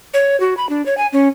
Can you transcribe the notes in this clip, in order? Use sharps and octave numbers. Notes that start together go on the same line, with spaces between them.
C#5
F#4
B5
D4
C#5
G#5
C#4